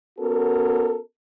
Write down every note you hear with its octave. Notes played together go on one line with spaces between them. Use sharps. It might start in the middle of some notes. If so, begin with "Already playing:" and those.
B3 C#4 F#4 A4 A#4